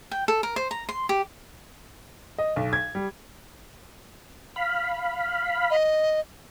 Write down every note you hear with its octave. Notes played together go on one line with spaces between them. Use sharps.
G5
A4
A#4
C5
A#5
C6
G4
D#5
B1
G#6
G3
F5 B5
D#5